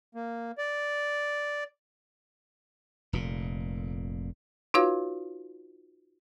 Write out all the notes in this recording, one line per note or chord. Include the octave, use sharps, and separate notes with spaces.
A#3
D5
F1 A#2
D#4 F4 F#4 B4 C#5 F5